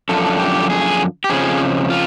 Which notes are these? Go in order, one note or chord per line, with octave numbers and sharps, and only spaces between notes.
F#2 D3 F3 A4
G4
G#4
G4
F2 C#3 F3 G#4
F4